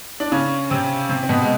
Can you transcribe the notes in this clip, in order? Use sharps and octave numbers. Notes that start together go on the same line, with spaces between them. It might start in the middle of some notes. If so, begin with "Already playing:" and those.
D4
C#3 C#4
C3 C4
C3 C4
C4
B2 B3
G#3